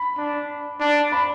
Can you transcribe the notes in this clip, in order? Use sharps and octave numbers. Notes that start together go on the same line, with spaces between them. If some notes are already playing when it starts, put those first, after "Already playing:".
Already playing: B5
D4
D4
B5